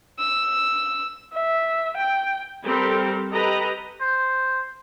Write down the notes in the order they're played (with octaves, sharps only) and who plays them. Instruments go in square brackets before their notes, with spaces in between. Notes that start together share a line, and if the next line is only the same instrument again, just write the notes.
[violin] E6
[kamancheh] E5
G5
[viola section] G3 C4 G4 A4 A#4
G4 A4 B4 D#5 A#5
[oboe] C5